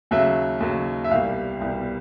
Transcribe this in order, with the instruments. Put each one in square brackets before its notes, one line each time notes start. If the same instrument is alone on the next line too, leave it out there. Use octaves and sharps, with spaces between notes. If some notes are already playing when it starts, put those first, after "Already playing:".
[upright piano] D#2 C#3 F#3 E5
D#2 C#3 F#3
E5
C2 B2 G3 F5
C2 B2 G3